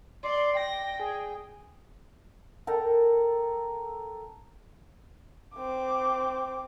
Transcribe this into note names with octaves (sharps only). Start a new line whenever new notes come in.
D5 C6
G5 A#6
G#4
A4 A#4 G5 A#5
C4 D6